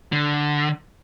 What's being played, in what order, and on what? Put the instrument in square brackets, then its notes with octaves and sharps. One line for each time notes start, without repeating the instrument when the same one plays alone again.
[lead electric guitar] D3